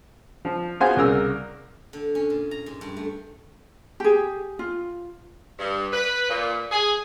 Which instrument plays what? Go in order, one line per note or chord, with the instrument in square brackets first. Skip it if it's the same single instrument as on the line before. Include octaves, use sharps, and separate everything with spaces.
[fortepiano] F3
B3 F4 F#4 G#4 C5 G#5
C2 C#3 A#4 E6
[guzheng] D3
C#4
A#2
A#5
G#2
G2
A3
[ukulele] G4 G#4
F4
[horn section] G2
B4
A#2
G#4